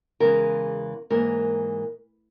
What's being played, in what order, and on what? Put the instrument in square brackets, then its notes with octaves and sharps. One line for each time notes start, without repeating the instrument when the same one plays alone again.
[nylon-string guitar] E2 C#3 E3 G#3 A#4
G#2 E3 A#3 A#4